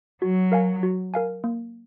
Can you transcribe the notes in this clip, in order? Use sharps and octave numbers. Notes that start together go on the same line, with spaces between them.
F#3 F#4
A#4 F5 G#5
F#4
A#4 F5 G#5
A#3